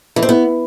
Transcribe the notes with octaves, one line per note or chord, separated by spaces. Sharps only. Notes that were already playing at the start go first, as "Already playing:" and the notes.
E3
C4
B3